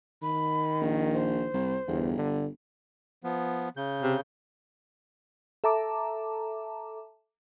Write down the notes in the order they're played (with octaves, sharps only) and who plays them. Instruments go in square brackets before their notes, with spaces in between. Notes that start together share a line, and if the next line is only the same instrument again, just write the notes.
[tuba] D#3 [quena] B5
[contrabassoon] A#1
[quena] C5
[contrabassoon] C2
[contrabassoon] G1 [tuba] E2
[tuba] D3
[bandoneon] F3 B3
C#3 G6
[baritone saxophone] C3
[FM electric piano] A4 E5 A5 A#5 D6